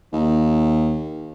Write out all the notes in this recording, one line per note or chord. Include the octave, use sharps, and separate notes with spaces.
D#2